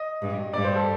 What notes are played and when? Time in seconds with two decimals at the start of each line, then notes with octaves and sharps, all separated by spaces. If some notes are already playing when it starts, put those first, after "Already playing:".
Already playing: D#5
0.22 G2
0.53 G2 D5
0.64 C5
0.76 A4